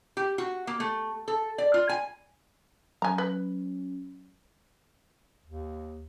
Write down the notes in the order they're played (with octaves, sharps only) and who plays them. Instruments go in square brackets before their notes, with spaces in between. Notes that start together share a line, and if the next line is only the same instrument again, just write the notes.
[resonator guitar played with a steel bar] G4
F#4
A#3
A3
A4
D5
F4
G#5
[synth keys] F#3 C#4 [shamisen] G#5 A#5
[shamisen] B4
[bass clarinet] D#2